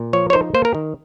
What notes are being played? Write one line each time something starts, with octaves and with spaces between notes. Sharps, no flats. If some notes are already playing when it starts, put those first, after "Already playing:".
Already playing: A#2
F3 C#5
C#5
D#4 C5
A#3 C5
A#4
D#3